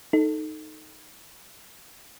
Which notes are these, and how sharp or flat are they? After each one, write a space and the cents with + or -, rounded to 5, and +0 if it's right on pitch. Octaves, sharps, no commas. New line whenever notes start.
D#4 +0 A4 +0